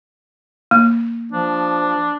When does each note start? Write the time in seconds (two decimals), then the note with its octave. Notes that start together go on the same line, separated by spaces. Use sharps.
0.71 A#3
1.32 F3 D4